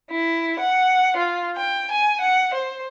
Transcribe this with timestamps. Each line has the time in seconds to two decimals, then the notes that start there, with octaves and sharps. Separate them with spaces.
0.11 E4
0.59 F#5
1.17 F4
1.57 G5
1.92 G#5
2.21 F#5
2.54 C5